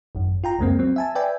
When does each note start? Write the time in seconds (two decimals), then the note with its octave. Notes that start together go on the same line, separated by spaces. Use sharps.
0.15 G#1 F#2
0.44 F4 G5 A#5
0.59 C#2 F#2 G#3 A#3 C4
0.79 F#3 C4
0.96 E5 G#5 A5
1.15 B4 D5 E5 G5 G#5